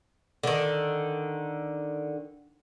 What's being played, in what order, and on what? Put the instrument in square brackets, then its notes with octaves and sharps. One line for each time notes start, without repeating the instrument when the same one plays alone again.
[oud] D3 D#3